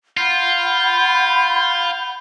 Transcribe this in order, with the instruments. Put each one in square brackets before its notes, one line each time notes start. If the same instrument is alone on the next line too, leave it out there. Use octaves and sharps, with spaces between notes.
[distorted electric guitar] F4 [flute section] F#5 B5 G6